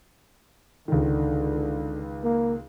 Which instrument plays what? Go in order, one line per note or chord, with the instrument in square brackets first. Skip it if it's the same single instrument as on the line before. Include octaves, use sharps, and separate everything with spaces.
[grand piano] C#2 D#3 [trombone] D3
[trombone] A#3